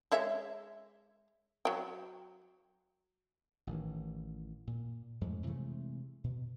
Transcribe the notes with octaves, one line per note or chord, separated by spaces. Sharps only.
G#3 C#5 E5
F#3 G5
A1 D#3 E3
A#2
F2 G#2 G#3 A3
C3 E3 G#3 A3
B2